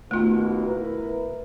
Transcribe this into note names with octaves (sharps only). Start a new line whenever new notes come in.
D#2 B2 A3 F4
E4 A#4 B4